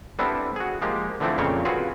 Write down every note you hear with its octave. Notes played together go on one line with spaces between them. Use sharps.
G3 B3 C4 D4 E4 A4
F#4 G#4
F3 G#3 A#3 G4
D3 E3 F3 A3 C4 E4
F2 A#2 C#3 A#3 C4 C#5
C4 F4 F#4 G#4 B4